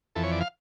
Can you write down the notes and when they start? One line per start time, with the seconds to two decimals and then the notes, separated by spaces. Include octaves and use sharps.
0.15 F2 E3 A4
0.23 C#5
0.32 D5
0.40 F5